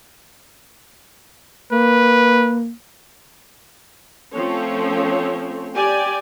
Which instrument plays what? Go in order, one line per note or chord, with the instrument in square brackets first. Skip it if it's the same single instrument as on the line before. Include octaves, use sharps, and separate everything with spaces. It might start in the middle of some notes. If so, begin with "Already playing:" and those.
[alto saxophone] A#3 [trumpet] B4
[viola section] F3 A3 C4 C#4 A4 C#5
G4 D5 G5 G#5